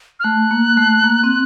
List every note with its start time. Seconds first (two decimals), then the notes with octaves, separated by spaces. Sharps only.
0.20 F6
0.24 A3 F#6
0.51 A#3
0.77 A3
1.04 A#3
1.24 C4